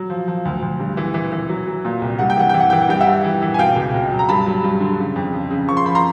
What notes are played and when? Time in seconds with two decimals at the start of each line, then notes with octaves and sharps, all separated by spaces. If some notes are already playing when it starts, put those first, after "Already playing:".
Already playing: F#3
0.10 F3
0.28 F3
0.45 D2
0.62 D2
0.80 G2
0.97 E3
1.14 E3
1.32 E3
1.49 F#3
1.67 F#3
1.85 A#2
2.02 C2
2.19 G2 F#5
2.30 G5
2.37 E3 F#5
2.49 E3 G5
2.60 F#5
2.70 E3 G5
2.81 F#5
2.88 G2 G5
3.01 E5 F#5
3.07 G2
3.24 E3
3.42 E3
3.54 G#5
3.59 B2 F5 G5
3.76 C#2
3.94 B2
4.12 F#3
4.19 A#5
4.29 G2 A5 B5
4.46 F#3
4.64 G2
4.80 D3
4.99 C#3
5.16 F2
5.33 C#3
5.51 C#3
5.68 F3 C#6
5.77 C6
5.85 F3 B5
5.95 A#5 C6